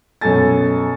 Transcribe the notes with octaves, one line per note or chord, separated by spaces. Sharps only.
F#2 B2 A4 G#5 A6